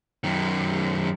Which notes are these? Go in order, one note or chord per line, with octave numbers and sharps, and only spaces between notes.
F#2 D#3